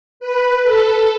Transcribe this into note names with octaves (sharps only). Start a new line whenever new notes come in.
B4
A4